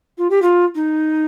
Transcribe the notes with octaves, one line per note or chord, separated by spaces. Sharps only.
F4
G4
F4
D#4